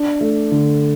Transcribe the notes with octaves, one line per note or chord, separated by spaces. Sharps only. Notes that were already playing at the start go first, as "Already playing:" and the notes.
Already playing: D4
A3
D3